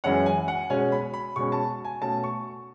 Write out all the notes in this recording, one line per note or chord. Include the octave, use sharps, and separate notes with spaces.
F#2 E3 G#3 C#4 F#5
G#5
F#5
B2 G#3 C#4 G#5
B5
B5
B2 G#3 C#4 C#6
A5
G#5
B2 A3 C#4 A5
C#6